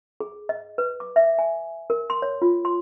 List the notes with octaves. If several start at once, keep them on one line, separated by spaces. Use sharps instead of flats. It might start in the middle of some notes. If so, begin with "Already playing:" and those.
G#4
D#5
B4
D6
E5
G#5
A#4
C6
C#5
F4
C6